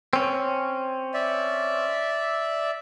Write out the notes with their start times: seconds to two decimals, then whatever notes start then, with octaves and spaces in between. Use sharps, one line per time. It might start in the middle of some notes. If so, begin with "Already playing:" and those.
0.13 C4 C#4
1.14 D5 E5